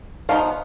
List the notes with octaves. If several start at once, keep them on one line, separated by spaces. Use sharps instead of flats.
F3 B3 D#4 F5